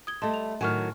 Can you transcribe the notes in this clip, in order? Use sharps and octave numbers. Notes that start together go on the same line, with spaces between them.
D#6 G#6 G7
G3 A3 D#5 A5 C6
F7
A2 D#3 F#3 G#5 C#6 F6